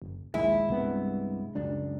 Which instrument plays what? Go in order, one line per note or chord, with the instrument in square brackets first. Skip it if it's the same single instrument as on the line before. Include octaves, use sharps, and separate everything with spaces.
[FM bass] F#1
[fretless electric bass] A#1 D#2 [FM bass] G#3 [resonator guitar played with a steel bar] E4
[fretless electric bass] C2 G2 B3
C#2 F#2 D4